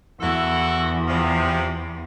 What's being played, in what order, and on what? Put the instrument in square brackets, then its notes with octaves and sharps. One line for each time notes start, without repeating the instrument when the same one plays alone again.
[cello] E2 [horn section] E4 F#4 A4
[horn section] C3 F3